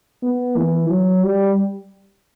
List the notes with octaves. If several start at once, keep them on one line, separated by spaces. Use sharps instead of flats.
B3
E3
F#3
G3